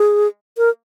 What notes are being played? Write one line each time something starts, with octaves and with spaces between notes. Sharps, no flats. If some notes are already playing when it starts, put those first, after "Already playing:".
Already playing: G#4
A#4